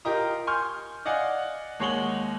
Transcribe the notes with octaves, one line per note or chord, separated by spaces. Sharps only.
F4 G4 A#4 D#5 A#5 D#6
G#5 C6 C#6 F6 G6
D5 D#5 F5 F#5 G#5
D#2 G#3 C#5 F#5 F#7 G7